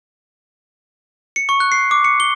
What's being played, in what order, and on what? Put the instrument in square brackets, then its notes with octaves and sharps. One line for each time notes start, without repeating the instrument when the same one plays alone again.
[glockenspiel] C#7
C#6
F#6
C7
D6
C#7
G7